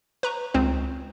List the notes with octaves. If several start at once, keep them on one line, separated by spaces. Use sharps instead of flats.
B4 A#5 C#6
C#2 C4 C5